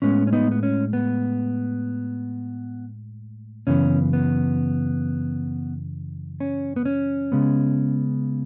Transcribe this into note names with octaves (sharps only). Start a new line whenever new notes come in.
A2 G#3 B3 C#4
C#4
B3 D#4
B3
C#4
B3
F#2 C#3 E3 B3 C#4
B3
C#4
B3
C#4
C#3 G#3 B3